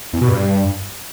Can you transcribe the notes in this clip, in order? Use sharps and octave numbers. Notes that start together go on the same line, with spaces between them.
E2
B2
G2